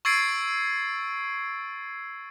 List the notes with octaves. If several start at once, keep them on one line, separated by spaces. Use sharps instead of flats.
C#6 E6 G#6 A6 C7 D7